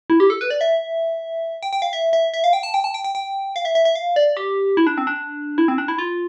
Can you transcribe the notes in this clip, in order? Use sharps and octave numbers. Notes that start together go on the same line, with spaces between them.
E4
G4
A4
B4
D5
E5
G5
G5
F5
E5
E5
E5
F5
G5
A5
G5
A5
G5
G5
G5
F5
E5
E5
E5
F5
D5
G4
E4
D4
C4
D4
E4
C4
D4
E4
F4